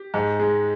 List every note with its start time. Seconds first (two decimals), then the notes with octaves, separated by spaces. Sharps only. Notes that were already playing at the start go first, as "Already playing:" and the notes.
Already playing: G4
0.14 G#2
0.40 G#3